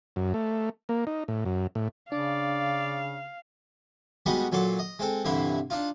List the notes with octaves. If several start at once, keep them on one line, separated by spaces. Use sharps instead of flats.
F#2
A3
A#3
D#4
A2
F#2
A2
C#3 D4 D5 F5
G3 G#3 B3 D#4 F#4 D#5
A#2 F#3 A4 C6 D6
D#5
G#3 C4 A4
C2 G2 D3 E3 E4 C6
D4 D#4 F4